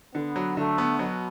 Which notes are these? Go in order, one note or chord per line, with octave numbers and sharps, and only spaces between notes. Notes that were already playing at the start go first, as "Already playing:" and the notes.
D3 B3
F#3
D3 A3
B3
B2 F#3